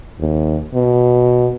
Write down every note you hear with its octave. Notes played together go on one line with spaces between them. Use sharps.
D#2
B2